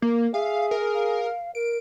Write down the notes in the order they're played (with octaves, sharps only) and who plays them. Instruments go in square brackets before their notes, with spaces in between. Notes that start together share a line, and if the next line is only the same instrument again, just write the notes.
[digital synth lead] A#3 [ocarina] A#4
[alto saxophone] G#4 [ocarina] E5 [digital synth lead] F5
[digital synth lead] A#4
[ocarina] F5
[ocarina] A#4 [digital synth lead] D7